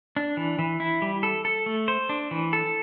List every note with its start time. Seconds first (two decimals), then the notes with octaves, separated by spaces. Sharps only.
0.16 D4
0.37 E3
0.59 E3
0.80 E4
1.02 G3
1.23 A4
1.45 A4
1.66 A3
1.88 C5
2.09 D4
2.31 E3
2.53 A4